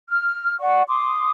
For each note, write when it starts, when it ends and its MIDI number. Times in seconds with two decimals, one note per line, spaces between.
0.09 0.56 89
0.59 0.82 74
0.59 0.82 78
0.59 0.82 85
0.88 1.31 84
0.88 1.31 86
0.88 1.31 87